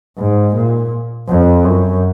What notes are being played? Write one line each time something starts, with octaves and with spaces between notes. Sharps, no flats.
G#2
A#2
F2
F#2